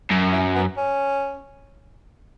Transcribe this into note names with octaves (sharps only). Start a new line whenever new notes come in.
F#2
E4
B3
C#4